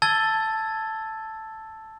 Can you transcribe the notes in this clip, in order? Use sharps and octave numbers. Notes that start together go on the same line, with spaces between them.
A5 E6 G#6 A6 G7